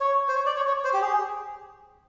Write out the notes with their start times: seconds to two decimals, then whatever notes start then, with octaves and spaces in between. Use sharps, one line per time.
0.01 C#5
0.28 C5
0.35 C#5
0.46 D5
0.56 C#5
0.67 C#5
0.84 C5
0.94 G4
1.02 G#4